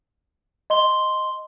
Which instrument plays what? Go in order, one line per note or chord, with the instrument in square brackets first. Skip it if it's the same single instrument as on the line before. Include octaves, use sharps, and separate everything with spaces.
[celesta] D#5 C6 G7